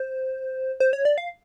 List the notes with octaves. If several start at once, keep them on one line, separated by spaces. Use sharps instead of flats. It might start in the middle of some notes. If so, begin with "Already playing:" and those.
Already playing: C5
C5
C#5
D5
F5